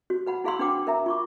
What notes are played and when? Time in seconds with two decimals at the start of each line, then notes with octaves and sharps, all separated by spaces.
0.10 F#4
0.26 B4 F#5 B5
0.44 E4 G#4 F5 B5 C6 E6
0.59 D4 F#4 B4 F#5 G5 D6
0.87 A#4 E5 A#5
1.06 F4 C#6 D6